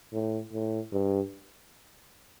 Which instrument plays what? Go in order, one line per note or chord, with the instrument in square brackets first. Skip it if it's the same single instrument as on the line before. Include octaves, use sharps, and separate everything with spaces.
[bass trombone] A2
A2
G2